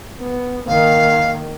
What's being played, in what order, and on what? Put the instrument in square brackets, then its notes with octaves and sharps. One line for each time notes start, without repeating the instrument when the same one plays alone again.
[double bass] B3
[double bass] D#3 A#3 [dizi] F5